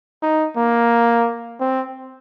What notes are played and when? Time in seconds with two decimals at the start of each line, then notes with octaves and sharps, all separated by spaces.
0.22 D#4
0.57 A#3
1.60 C4